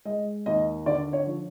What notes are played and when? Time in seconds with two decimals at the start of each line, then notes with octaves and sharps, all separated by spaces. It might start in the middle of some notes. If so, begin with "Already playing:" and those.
0.05 G#3 D#5
0.46 D#2 D#5
0.86 D3 D5
1.13 C#5
1.27 F3